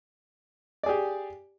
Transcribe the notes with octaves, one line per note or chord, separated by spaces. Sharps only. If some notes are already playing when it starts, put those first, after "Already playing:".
G4 G#4 D5